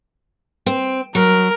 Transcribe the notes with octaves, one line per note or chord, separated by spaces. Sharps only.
C4
F#3 A#4